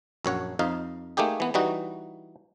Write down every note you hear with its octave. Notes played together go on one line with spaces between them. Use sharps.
A#1 F#2 C#5 F#5
F2 D#4 F5
A3 A#3 D#4 G4 G#4
E3 B3
E3 G3 D#4 F#4